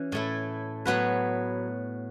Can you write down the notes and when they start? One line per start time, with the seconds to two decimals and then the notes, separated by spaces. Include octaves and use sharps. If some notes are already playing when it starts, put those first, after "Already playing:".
Already playing: E3 C#4 F#4
0.12 A2 A3 E4
0.85 A2 F#3 B3 F#4 B4